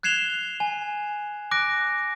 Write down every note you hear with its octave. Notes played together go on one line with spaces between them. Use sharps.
F#6 G#6 C7 E7 F7 G7
G#5
D6 F#6 A#6 D7